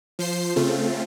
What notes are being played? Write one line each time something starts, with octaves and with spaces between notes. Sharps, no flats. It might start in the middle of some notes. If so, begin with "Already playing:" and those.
F3 C5 C7
C#3 A3 C4 F4